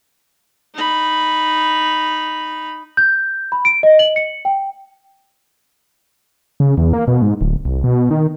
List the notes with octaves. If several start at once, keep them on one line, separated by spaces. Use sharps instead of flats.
D#4 B5
G6
B5
D7
D#5
F#7
C#7
G5
C#3
E2
A#3
B2
G#2
D1
C2
B2
D#3